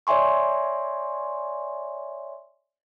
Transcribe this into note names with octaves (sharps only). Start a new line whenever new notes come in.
C#5 D5 E5 G#5 C6 C#6